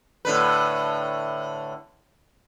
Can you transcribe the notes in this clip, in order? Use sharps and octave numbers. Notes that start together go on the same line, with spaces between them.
A2 D3 B4